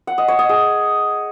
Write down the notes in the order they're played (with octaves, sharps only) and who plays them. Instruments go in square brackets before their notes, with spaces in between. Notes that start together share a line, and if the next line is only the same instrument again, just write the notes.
[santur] F#5
D#5
C#5
D#5
G#4